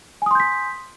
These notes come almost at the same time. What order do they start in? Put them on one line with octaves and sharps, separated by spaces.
G#5 D#6 C6 G6 B6